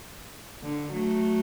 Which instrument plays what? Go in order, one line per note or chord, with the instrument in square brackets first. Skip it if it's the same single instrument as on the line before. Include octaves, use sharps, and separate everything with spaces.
[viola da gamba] D3
F#3 A3